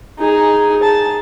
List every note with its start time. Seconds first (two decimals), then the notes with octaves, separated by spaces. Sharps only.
0.19 D#4 G#4
0.83 A5